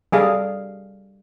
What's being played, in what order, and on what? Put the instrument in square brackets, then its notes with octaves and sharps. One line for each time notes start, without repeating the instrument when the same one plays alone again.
[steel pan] G3 G#4 A4 F5